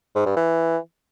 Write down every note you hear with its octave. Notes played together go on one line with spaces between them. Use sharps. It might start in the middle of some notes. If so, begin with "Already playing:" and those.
G#2
G2
E3